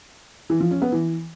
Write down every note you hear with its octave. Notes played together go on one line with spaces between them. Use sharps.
E3
F3
C#4
B3
E3